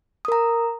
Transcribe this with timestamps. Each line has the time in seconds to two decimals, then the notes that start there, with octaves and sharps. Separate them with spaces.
0.25 D#6
0.28 A#4
0.32 A#5